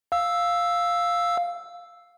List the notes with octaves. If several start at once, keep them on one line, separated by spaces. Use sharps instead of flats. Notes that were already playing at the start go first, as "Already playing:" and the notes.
F5 E6